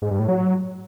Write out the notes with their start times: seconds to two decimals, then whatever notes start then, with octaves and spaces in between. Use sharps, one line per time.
0.02 G#2
0.11 G2
0.19 A2
0.28 F#3